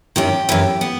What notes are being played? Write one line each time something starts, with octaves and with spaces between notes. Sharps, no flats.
F#2 D#3 G4
F#2 E3
B3